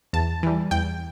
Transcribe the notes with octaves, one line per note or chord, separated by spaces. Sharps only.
E2 A5
E3 G3
E2 G5